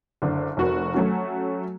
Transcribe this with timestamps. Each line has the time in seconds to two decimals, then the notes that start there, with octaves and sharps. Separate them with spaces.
0.22 F#1 D3
0.57 F1 F#4 A#4
0.94 F#3 A3 C#4 F#4